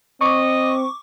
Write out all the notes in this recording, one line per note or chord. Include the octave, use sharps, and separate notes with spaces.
C4 D#5 C#6 D6